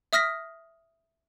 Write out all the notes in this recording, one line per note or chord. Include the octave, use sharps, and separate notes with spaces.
E5 D#6 F6 A#6 B6